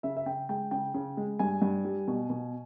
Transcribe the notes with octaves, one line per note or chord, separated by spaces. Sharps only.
C#3 E5
E5
C#3 G5
G#3 G5
C#3 G5
C#3
G#3
G2 G#5
G2
G3
B2
B2